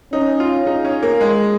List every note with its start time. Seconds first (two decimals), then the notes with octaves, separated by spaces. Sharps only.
0.12 C#4 D#4
0.40 F4
0.67 D#4 G#4
0.85 C#4
1.03 A#3
1.21 G#3